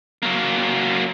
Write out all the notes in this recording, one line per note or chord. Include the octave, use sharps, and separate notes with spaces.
F#3 A#3